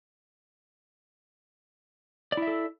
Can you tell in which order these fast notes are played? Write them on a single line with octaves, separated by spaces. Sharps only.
D5 E4 E5 A4